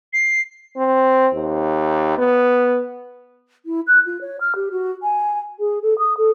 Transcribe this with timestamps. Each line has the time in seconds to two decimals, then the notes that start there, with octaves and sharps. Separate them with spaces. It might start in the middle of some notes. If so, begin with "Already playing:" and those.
0.13 C7
0.77 C4
1.33 D#2
2.18 B3
3.66 E4
3.87 F#6
4.06 F4
4.21 C#5
4.41 F6
4.55 G4
4.71 F#4
5.03 G#5
5.59 G#4
5.82 A4
5.99 D#6
6.17 A4